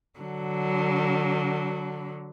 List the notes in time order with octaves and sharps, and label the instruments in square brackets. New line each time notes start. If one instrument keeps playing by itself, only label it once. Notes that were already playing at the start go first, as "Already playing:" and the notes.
[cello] D3 F#3